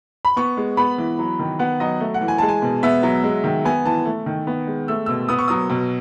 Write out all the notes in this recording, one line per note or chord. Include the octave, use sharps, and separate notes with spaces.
B5
B3 C#6
G#3
B3 B5
E3
F#3
D#3
B3 F#5
F#3 D#5
A3
F#5
E3
G#5
G#3 A5
G#5
B2
B3 E5
F#3
G#3
D#3
B3 G#5
E3 A5
A3
D#3
B3
G#3
A3 E6
B2 E6
B3 D#6
C#6
F#3 D#6
B2